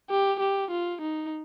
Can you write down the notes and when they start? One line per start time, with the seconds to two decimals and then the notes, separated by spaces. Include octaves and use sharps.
0.10 G4
0.40 G4
0.71 F4
1.01 D#4